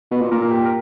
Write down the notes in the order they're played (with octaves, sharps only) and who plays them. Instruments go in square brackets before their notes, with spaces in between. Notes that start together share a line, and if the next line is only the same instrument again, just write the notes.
[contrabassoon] B2 [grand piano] B4
[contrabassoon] A#2
[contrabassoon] A#2 [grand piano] A#4
[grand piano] A#4
G4
A#4